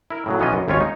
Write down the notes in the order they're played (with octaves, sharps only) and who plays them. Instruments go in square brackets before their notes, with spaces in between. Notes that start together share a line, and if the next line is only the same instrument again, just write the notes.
[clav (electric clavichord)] E4 A#4
A2 C#3 F#3
B1 E3 B3 C#4 F4 D#5
F#2
G#1 D#2 C#4 F4 C#5
D#4